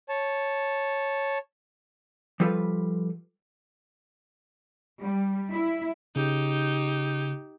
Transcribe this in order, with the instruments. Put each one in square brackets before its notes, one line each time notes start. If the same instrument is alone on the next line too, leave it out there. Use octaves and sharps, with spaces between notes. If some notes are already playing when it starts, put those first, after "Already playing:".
[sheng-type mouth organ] C#5 A5
[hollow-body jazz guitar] F3 G3 F4 A4 B4
[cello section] G3
E4
[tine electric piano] C#3 [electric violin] D#4 G4